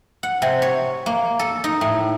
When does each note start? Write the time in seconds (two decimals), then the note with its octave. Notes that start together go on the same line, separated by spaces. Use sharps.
0.23 F#5
0.42 C3
0.62 C#5
1.06 A#3
1.39 A4
1.64 D#4
1.81 A2